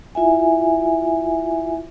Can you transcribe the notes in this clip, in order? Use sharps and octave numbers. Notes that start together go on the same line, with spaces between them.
E4 F4 E5 G#5